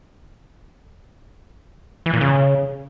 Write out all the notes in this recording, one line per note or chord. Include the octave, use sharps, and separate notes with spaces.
E3
A#2
C#3